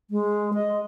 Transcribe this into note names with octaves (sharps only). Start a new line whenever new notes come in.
G#3
D#5